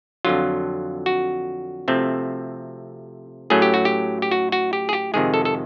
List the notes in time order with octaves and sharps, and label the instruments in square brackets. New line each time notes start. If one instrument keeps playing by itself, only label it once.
[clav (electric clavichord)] F2 D3 F#3 F4
F#4
C3 F3 A3 C4
A2 F#3 A3 C#4 G#4
G4
F#4
G4
G4
F#4
F#4
G4
G#4
G4
F2 C3 D#3 G#3 G#4
A4
A4